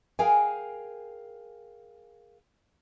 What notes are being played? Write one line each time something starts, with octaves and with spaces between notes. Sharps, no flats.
G#4 A#4 F5 G5 G#5